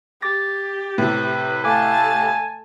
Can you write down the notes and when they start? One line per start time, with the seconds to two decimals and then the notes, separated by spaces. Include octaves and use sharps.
0.22 G4 D6 A6 A#6
0.98 A2 C3 B4
1.64 A3 F5 G#5 A5 D6 F#6